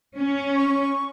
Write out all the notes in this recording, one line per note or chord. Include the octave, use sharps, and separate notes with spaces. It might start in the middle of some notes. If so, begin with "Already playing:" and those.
C#4
C#6